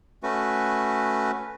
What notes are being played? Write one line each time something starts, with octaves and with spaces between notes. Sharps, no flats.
A3 C#4 F#4 B4